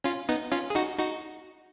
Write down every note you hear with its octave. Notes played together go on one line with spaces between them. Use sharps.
C#4 F4
B3 D#4
C#4 F4
G#4
D#4 F#4
D#4 F#4